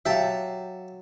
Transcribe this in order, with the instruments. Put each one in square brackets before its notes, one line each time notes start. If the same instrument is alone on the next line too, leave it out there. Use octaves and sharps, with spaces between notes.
[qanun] F#3 [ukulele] G4 F5 [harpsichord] E5 A5